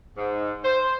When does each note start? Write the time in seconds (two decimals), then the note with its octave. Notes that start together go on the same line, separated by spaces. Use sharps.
0.17 G#2
0.65 C5